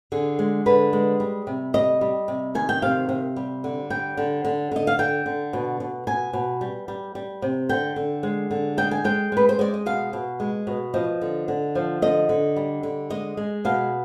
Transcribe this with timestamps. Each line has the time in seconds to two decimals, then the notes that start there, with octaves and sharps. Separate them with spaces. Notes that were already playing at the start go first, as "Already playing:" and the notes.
0.12 D3 G#4
0.39 G#3
0.66 D3 B4
0.93 G#3
1.20 G3
1.47 C3
1.74 G3 D#5
2.01 G3
2.28 C3
2.55 D#3 G#5
2.69 G5
2.82 C3 F5
3.09 C3
3.36 G3
3.64 D3
3.90 G3 G5
4.17 D3
4.45 D3
4.72 D3 D#5
4.87 F5
4.99 D3 G5
5.26 D3
5.53 B2
5.80 B2
6.07 B2 G#5
6.33 B2
6.61 G3
6.88 G3
7.15 G3
7.42 C3
7.69 D3 G5
7.96 D3
8.23 G#3
8.51 D3
8.77 G#3 G5
8.91 G#5
9.04 G#3 G5
9.32 G#3 B4
9.49 C5
9.59 G#3 D5
9.74 D#5
9.86 B2 F5
10.13 B2
10.40 G#3
10.67 B2
10.94 F3 D#5
11.21 D3
11.48 D3
11.75 F3
12.02 D3 D#5
12.29 D3
12.56 G3
12.83 D3
13.10 G#3 D#5
13.37 G#3
13.65 B2 F5